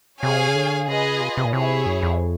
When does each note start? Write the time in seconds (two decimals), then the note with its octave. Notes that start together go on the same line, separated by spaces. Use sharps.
0.22 C3 G#4 C#5 F5 G#5
0.48 C#3
0.55 D3
0.88 C#3 F4 G#4 B4 D#5 G#5
1.21 C3
1.37 C3
1.45 A#2
1.53 C3 E4 G#4 C#5
1.86 F#2
2.03 F2